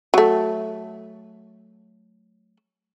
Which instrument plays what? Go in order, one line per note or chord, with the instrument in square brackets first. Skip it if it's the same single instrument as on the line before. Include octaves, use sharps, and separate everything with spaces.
[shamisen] F#3 A3